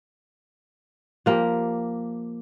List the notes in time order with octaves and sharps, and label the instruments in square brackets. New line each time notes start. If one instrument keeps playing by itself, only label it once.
[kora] F3 A#3 G4